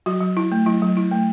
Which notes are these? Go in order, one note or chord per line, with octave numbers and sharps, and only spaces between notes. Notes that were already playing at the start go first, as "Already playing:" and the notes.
F#3 F#4
F#3
E4
A3
F#3 E4
F#3
E4
A3